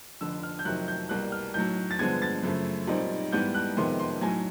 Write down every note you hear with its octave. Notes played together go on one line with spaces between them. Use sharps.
F1 F2 D3 E6
F6
G6
F2 C3 D#3 F#3 F#6
G6
C2 B2 G3 A#3 F#6
F6
B1 A2 F#3 G6
A6
G2 D3 F3 G#3 B3 G#6
A6
F#2 C#3 F3 A3
B1 A#2 G3 C4 D#4
G#2 E3 G3 B3 G6
F#6
F2 C3 D#3 G#3 B3 C6
C6
B1 A2 F#3 G#5